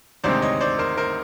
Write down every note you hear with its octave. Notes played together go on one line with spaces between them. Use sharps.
D2 C3 D#3 G#3 C4 C5 D5
C#5 D#5
C5 D5
A#4 C5
A#4 C5